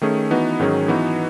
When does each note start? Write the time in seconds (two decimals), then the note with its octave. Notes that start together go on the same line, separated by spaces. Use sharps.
0.01 D#3 A3 C#4 G#4
0.31 E3 B3 D#4 F#4
0.59 G#2 D#3 F#3 C#4 G#4
0.88 E3 B3 D#4 F#4